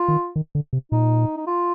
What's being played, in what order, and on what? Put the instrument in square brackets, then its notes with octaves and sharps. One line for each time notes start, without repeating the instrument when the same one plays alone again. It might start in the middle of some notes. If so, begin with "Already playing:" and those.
Already playing: [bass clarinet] F4
[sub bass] D#3
D#3
D3
C3
[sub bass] A#2 [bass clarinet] D#4
[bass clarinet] D#4
F4